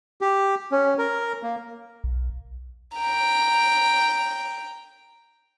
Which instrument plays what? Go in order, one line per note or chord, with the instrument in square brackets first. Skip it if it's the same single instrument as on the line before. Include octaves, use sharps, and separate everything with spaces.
[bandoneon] G4
C#4
A#4
A#3
[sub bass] B1
[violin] G5 A#5